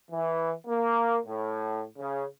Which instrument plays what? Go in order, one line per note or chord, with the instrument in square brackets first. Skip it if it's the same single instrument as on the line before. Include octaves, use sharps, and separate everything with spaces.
[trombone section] E3
A#3
A2
C#3